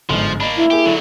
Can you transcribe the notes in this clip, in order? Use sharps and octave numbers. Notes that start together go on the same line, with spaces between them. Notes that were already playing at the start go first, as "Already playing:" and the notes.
G1 G#2 F3
A#3 D4 D#5 B5
E4
A#3 G4 G#4
D3 F#3 A4 E7